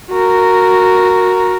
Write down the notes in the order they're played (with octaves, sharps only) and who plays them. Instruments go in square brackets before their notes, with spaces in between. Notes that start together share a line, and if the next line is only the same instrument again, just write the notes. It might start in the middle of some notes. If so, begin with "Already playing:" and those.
[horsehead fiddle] F#4 A#4